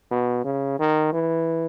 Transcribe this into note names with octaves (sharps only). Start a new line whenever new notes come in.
B2
C#3
D#3
E3